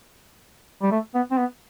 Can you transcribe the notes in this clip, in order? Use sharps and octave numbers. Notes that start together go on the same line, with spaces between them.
G3
A3
B3
C4
B3